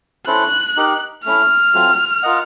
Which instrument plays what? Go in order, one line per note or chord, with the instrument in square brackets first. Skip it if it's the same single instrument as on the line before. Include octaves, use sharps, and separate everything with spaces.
[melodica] C#4 E4 A4 C5 [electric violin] F#6
[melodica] D#4 G4 A#4
[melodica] A3 C#4 E4 [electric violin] F6
[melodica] F#3 A3 C4 F4
F4 A#4 D#5 F#5